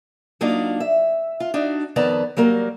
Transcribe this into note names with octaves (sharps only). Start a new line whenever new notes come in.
F#3 A#3 D4 D#4 F4
E5
F4
D4 D#4 F#4
F2 D#3 B3 D5 A5 A#5
F#3 G3 A#3 A#4